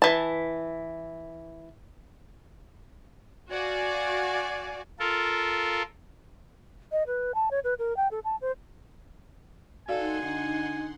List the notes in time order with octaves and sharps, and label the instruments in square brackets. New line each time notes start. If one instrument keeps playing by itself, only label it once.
[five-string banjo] E3 A5
[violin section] F#4 D5 F5 G#5
[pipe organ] F4 A4 A#4
[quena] D#5
B4
A5
C#5
B4
A#4
G5
A4
A5
C5
[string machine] D#4 F#5 C6 [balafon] F#4 D5 F5 [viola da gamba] A4 [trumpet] G#5
[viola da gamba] D3